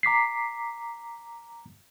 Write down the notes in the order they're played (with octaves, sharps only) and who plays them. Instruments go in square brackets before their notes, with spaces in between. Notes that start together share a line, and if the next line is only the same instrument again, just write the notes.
[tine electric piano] A#5 D6 B6 C7